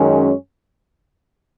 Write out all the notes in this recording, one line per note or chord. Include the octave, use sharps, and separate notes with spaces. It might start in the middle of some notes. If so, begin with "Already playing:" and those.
Already playing: F#2 D#3 G#3 C#4